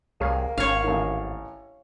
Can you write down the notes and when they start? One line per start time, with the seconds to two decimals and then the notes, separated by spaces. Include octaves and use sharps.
0.21 C2 A#3 G#4 C#5 F5
0.58 G#1 C#4 C#5 F5
0.84 A1 D#3